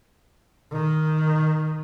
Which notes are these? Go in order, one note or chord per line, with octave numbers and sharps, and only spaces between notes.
D#3